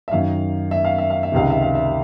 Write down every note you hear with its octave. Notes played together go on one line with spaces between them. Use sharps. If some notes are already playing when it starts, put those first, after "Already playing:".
E5
F#2 D#3 F5
E5
F5
E5
F5
E5
C#2 C3 D#3 F5
E5
F5
E5